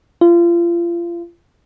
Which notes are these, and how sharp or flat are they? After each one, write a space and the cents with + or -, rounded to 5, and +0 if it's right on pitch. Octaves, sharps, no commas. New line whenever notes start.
F4 -30